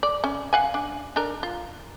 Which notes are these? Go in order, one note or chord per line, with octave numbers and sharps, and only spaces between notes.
D5
C#4
F5 F#5 G#5
D4
D4 D#4 A#4
F4